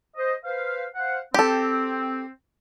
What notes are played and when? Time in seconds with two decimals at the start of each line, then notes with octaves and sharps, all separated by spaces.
0.17 C5 D#5
0.45 B4 C5 F5
0.95 C5 F5 F#5
1.34 C4 G4 A4